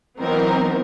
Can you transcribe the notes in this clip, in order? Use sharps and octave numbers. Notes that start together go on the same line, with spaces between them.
E3 F#3 B3 C4 D#4 A#4